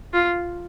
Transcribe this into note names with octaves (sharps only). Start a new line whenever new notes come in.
F4